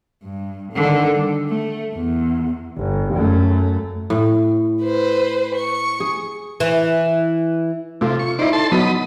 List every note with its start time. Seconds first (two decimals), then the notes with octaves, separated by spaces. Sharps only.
0.23 G2
0.72 D3 D#3
1.14 G3
1.49 A3
1.95 E2
2.77 G1
3.13 F#2 A3
4.10 A2
4.83 B4 C5
5.55 C#6
6.00 G#4
6.60 E3
8.01 C3 A3 F4
8.19 C#6
8.39 D#4 E4 C5 D5
8.53 A4 A5 C6
8.72 F#3 B3 D#5 B5